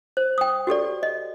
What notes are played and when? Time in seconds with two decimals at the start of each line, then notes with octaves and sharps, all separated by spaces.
0.17 C5
0.38 G5 D#6
0.67 F#4 G4 A4 D5
1.03 D#5